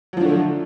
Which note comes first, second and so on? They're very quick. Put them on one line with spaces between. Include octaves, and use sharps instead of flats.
F#3 F3 D4 A3 D3